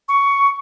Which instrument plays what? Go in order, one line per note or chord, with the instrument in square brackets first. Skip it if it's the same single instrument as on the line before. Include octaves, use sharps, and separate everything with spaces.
[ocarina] C#6